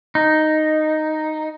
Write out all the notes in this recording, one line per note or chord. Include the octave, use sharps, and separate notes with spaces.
D#4